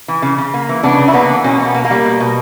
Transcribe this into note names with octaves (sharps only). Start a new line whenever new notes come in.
E3
C#3
C#3
A#3
E3
C#3 B3 D4
C#3
E4
A#3 B3 D4
E3
B2 A#3 C#4
B2
B3
A#3
A#3
G3
B2
B2